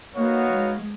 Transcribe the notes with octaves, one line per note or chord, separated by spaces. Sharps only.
A#3 B3 D#4 F#4 C#5 F5
G#3